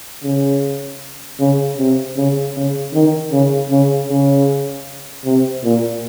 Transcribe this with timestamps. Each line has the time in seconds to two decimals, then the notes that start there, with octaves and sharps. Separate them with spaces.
0.23 C#3
1.39 C#3
1.78 C3
2.16 C#3
2.55 C#3
2.93 D#3
3.32 C#3
3.70 C#3
4.09 C#3
5.25 C3
5.63 A#2